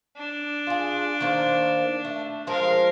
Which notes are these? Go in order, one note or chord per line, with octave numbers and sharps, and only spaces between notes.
D4
F4 G#4
D#3 A#3 C5
A3
F3 G#3 A#4 C5 F5